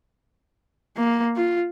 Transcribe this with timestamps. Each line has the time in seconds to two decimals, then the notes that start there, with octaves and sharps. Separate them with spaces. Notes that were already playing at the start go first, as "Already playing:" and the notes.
0.97 A#3
1.36 F4